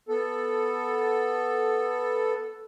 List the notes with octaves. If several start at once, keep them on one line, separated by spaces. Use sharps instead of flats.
B3 A4